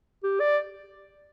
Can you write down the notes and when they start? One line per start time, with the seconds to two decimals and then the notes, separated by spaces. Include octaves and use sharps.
0.23 G4
0.40 D5